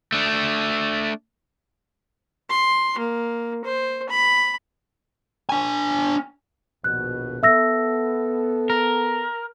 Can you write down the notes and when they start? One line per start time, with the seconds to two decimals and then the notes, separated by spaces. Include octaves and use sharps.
0.12 A3 D4
2.50 C6
2.98 A#3
3.65 C5
4.10 B5
5.49 D4 G#5
6.84 A#1 D#2 B2 F#6
7.43 B3 A4 E5 E6 A#6
8.70 A#4